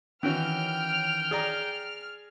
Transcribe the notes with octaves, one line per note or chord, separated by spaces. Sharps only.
D#3 E3 C#4 F#4 G5 F6
G#4 D5 A#5